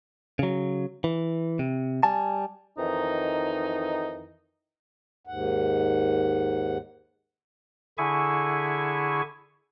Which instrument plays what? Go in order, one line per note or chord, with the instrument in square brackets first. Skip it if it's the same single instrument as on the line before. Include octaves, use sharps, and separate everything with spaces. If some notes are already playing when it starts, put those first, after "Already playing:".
[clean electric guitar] C#3 F#3
E3
C3
G3 G#5 A5
[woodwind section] F2 D#3 E3 D#4
[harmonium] D#2 G#2 F#5
[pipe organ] D3 E4 G#4 E5 G#5 C#6